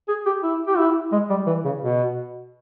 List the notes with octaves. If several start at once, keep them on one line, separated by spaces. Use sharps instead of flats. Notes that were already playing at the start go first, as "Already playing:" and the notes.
G#4
G4
E4
G4
E4
G#3
G3
E3
C#3
B2